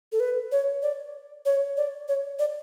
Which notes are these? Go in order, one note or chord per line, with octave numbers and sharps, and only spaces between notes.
A4
B4
C#5
D5
C#5
D5
C#5
D5